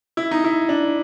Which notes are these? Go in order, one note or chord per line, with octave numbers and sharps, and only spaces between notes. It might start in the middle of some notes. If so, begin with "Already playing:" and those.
E4
D#4
E4
D4